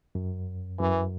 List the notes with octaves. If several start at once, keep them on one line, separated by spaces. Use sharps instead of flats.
F#2
F#2 E3